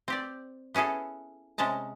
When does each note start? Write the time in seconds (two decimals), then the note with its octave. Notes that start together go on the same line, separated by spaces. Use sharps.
0.08 C4 G4 D5
0.74 B3 C#4 E4 G#4 A4
1.58 C3 G#3 C#4 A5 A#5